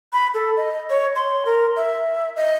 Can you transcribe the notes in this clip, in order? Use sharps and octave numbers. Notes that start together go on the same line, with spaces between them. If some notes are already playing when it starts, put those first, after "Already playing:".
B5
A4
D#5
C#5
C6
A#4
E5
D#5